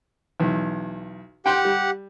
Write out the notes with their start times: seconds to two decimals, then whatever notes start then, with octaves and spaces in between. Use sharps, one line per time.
0.40 B1 E2
1.46 G4 F#5 G5 C6
1.65 G3